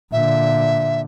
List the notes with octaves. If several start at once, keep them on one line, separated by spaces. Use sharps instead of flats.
A#2 D3 E5